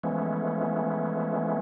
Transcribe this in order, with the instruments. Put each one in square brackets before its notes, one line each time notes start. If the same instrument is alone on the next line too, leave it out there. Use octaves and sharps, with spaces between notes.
[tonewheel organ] E3 F3 G#3 A3 B3 C#4